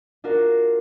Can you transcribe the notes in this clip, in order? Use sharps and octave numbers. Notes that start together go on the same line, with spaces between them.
D4 F4 F#4 A#4